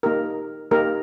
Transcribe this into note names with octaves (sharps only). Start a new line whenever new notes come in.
A#3 D#4 G4 A#4
A#3 D#4 G4 A#4